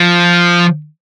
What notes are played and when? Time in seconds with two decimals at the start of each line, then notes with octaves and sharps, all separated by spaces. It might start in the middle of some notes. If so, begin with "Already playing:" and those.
Already playing: F3